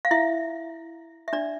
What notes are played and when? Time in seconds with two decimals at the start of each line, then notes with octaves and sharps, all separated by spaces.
0.05 F5
0.11 E4 E5
1.28 E5
1.33 D4 D5